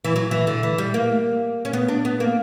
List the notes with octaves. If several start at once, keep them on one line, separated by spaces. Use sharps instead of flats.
E3
F#3
E3
D3
E3
G3
A#3
C#4
B3
D4
B3
A#3